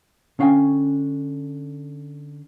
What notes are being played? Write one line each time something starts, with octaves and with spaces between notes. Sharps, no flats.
D3 C#4 F5 G5 G#5